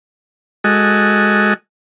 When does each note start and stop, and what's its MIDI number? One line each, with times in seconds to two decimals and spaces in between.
0.64 1.54 56
0.64 1.54 66
0.64 1.54 69
0.64 1.54 75